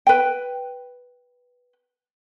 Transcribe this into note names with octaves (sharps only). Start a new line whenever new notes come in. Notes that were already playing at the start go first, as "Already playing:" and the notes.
B4 G5